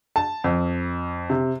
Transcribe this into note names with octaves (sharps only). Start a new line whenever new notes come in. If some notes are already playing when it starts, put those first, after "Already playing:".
A5
F2
C3